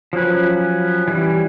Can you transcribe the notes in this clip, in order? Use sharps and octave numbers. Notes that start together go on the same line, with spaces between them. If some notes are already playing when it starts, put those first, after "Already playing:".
F3 F#3 C#4 B4
E3 G3